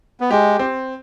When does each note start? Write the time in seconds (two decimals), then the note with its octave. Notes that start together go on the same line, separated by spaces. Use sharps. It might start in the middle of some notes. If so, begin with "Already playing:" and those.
0.21 B3
0.31 G#3 G4
0.59 C4